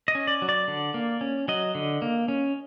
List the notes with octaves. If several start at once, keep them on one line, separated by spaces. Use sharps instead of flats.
D#5
C#4
D5
F#3
D5
D3
A#3
C#4
F#3 D#5
D3
A#3
C#4